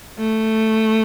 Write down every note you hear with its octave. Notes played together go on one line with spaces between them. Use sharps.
A3